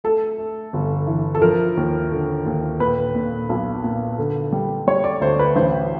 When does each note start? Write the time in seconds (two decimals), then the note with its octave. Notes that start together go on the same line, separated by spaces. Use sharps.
0.04 A3 A4
0.38 A3
0.73 G1
1.07 E3
1.35 A4
1.42 F3 A#4
1.77 D#2
2.12 D3
2.46 D#2
2.80 A#2 B4
3.15 A#2
3.49 B1
3.84 A#2
4.19 D3
4.52 G3
4.87 G3 C#5
5.04 D5
5.21 D2 C5
5.39 B4
5.55 A1 C5